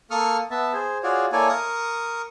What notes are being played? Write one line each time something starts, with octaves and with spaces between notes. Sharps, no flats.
A#3 A4 C#6 D#6 F6
B3 E5 A5
G#4 C5
F4 F#4 G#4 C#5 D5
A#3 E4 A4 C#5 D5 G#5
A#4 C#6 D#6